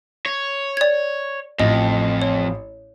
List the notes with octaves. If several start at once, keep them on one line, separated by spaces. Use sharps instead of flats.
C#5
D5 G#6
A1 F2 D#5
C#5